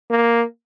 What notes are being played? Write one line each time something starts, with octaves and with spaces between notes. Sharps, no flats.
A#3